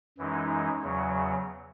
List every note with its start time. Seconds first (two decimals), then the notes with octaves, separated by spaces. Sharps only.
0.18 F#2 E3 G#3 D#4
0.82 E2 C#3 F#3